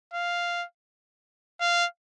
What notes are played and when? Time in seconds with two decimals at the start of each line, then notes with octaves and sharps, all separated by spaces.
0.13 F5
1.60 F5